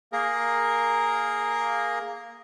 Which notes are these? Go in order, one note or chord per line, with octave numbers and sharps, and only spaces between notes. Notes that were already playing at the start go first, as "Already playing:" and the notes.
A#3 G#4 A#4